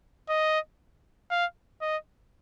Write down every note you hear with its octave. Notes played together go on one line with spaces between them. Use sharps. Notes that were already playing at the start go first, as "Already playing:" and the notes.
D#5
F5
D#5